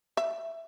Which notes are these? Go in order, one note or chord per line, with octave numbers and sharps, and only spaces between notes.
E5